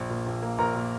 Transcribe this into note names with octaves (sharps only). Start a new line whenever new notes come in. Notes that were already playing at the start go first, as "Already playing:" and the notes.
Already playing: A#1
A#2
A#1
A#3
A#1 A#4 A#5
A#2